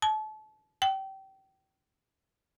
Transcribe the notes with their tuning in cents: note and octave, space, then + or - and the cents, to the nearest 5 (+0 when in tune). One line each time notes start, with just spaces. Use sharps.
A5 -35
G5 -25